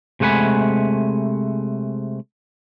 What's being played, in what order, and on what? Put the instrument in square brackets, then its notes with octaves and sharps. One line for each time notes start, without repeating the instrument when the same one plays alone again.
[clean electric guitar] C3 G#3 A3 F#5 G#5 B5